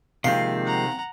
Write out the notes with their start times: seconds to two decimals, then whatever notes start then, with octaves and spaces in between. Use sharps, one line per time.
0.24 C3 D#3 F3 G#3 A#3 C4 F5
0.65 F#5 A#5